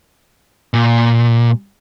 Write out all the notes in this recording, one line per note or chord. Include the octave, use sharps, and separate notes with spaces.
A#2